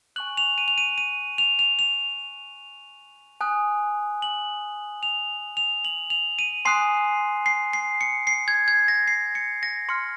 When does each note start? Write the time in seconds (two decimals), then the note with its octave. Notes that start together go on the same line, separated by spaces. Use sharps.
0.16 G#5 C#6 F#6 F#7
0.37 F7
0.58 D#7
0.68 F7
0.78 D#7
0.98 D#7
1.38 F7
1.59 F7
1.79 F7
3.41 G#5 D#6 F#6
4.22 F#7
5.03 F7
5.57 F7
5.85 F#7
6.10 F7
6.39 D#7
6.65 G#5 C6 D#6 F#6 C7
7.46 C7
7.73 C7
8.01 C#7
8.27 C7
8.48 G#6
8.68 G#6
8.88 A#6
9.08 C7
9.35 C#7
9.63 A#6
9.89 C6 F6 C#7